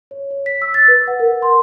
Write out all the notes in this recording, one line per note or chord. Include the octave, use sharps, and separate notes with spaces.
C#5
C#5
B6
E6
A6
B4
F#5
A#4
C6